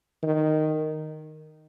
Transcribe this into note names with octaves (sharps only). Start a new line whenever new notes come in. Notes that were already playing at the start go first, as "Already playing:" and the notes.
D#3